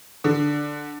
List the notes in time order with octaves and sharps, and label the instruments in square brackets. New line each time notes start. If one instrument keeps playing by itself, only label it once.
[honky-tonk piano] D3